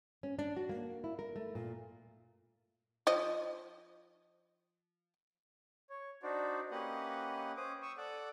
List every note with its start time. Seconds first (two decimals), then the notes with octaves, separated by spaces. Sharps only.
0.23 C#4
0.39 D4
0.57 F#4
0.69 A#3
1.04 E4
1.19 A#4
1.36 A3
1.55 A#2
3.07 F3 D#5
5.90 C#5
6.23 D4 D#4 F#4 C5 D5
6.71 A#3 C#4 G4 B4 D#5 F#5
7.57 C#4 C5 D6 D#6
7.82 C#6 D#6 E6
7.98 A4 D5 F#5 D6